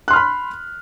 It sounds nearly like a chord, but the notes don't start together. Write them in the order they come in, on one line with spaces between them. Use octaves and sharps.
F#6 C6 F6 B5